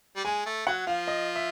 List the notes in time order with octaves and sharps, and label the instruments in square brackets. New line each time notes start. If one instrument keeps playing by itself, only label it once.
[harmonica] G3
[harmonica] G#3 [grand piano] G#5
[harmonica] A3
[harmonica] F#3 [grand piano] F#5
[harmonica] F3 [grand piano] F5
[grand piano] D#5
E5